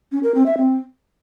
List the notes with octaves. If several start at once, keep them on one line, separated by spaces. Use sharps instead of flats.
C#4
A#4
C4
E5
C4